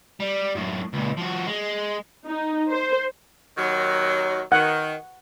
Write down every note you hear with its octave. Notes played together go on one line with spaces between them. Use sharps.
G3
F#2 A2
C#2 A#2
F3 F#4
G#3
D#4
C5
D#2 D#3 F#3
D#3 F#5